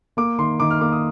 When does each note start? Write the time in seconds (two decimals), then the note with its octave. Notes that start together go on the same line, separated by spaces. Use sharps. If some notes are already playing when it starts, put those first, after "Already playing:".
0.17 A#3 D6
0.38 D#3 C6
0.60 D#3 D6
0.70 F6
0.81 A#3 D6
0.92 D#6